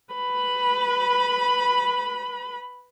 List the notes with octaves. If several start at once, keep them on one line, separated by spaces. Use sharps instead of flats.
B4 B5